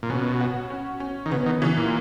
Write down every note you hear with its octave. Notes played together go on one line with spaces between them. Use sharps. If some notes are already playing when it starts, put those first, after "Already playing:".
A#2
B2 C#4
F#4
C#4
C#4
D#3
C#3 B3
D#3
C#3 E3
A#2